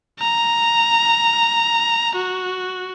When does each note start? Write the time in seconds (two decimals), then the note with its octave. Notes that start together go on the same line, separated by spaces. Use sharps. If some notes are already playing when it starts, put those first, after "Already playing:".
0.19 A#5
2.15 F#4